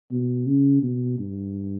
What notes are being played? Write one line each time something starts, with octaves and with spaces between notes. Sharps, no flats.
B2
C#3
B2
G2